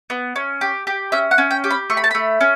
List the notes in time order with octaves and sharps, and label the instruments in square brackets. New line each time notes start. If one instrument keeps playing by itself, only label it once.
[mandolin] B3
C#4
G4
G4
C#4 E5
F#5
C#4
G5
G4
B5
A3 C#6
B5
A5
A3 B5
C#4